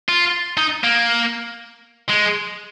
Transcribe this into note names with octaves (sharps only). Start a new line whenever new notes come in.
F4
D#4
A#3
G#3